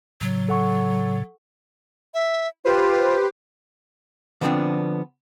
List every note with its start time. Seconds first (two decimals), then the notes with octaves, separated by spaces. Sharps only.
0.21 A2 C#3 F#3
0.49 A4 F#5 C#6
2.14 E5
2.65 F4 G4 B4 C5
4.41 D3 F3 G3 B3 C4 D4